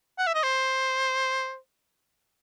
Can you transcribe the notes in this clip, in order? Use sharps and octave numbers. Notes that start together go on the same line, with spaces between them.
F#5
E5
D#5
C5